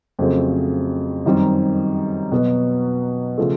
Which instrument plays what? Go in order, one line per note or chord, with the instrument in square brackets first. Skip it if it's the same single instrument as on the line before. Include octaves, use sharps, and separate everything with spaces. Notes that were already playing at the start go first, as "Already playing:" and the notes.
[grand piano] F2 C#3 F#3 A3 C4
F#2 D#3 G3 C4 D#4
B2 F#3 B3
C#3 F3 A3